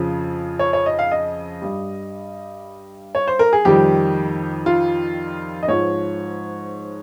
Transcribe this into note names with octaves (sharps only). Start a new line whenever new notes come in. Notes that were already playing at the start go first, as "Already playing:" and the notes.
Already playing: F2 C#3 F3
C#5
C#5
D#5
F5
D#5
G2 G3
C#5
C5
A#4
G#4
F2 D#3 G3 G4
F4
D#5
G#2 F3 C#5